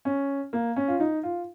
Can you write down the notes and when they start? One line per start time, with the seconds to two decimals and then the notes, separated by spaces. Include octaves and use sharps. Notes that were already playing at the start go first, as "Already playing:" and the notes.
0.05 C#4
0.53 A#3
0.76 C#4
0.88 F4
1.00 D#4
1.23 F4